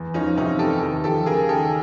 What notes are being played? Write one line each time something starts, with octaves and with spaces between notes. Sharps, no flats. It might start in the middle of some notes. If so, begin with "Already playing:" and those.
Already playing: E2
F3 C#4 D#4
C3 C#4 D#4
E2 G4 A4
D#2
F3 G4 A4
C#3 G#4 A#4
D#2 G4 A4